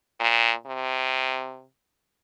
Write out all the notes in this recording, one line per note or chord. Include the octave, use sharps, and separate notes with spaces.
A#2
C3